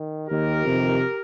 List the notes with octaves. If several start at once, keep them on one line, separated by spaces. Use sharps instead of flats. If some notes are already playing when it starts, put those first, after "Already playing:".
Already playing: D#3
D#2 D#3 G4 A#4
F2 C3 D#3